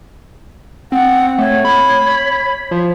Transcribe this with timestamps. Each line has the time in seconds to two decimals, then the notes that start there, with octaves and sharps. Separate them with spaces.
0.92 C4 F#5
1.38 A3 C#5
1.65 B5
2.71 F3